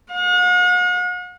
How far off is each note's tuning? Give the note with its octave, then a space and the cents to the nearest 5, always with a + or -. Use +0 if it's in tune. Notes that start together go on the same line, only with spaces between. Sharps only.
F#5 -45